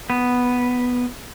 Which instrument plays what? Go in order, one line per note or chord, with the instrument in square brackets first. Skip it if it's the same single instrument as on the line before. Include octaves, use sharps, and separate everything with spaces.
[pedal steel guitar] B3